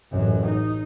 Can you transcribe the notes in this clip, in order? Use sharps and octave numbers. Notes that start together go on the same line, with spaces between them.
A1 F#2
D#4